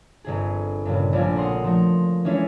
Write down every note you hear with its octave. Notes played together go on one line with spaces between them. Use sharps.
G1 C3 G#4
G2 A#2 C#3 G3
A#1 A2 C4 D5 F5 G#5
A#4 F#5 C6 D#6 F#6
F3 A3 A#4
E3 G#3 B3 C#4 D4 E4